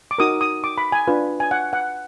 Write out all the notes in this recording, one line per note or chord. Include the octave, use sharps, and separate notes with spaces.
D6
D#4 F#4 A#4 D#6
D#6
D6
B5
G#5
D4 F4 B4
G#5
F#5
F#5